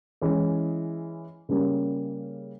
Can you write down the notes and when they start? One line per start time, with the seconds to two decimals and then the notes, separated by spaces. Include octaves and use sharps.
0.21 E3 G#3 C#4 E4 G#4
1.49 C#3 G3 A#3 C#4